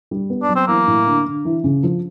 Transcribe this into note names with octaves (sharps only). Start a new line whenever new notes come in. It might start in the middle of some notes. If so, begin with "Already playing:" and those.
G3
B3
D4
F#3
C4
E3 A#3
A2
D3
D3
E3
C#3
F3